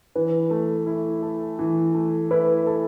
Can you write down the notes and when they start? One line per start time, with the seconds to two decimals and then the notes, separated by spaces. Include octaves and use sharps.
0.15 E3 B4
0.50 A3
0.86 E4
1.22 A4
1.59 E3
1.94 A3
2.31 E4 B4
2.67 A4